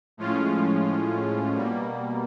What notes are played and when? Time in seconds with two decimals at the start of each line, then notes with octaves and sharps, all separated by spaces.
0.17 A2 F3 G#3 C#4 F4
1.52 B2 G3 A#3